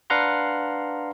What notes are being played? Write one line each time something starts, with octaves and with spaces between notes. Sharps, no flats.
D4 B4 F5 F#5 A#5 C6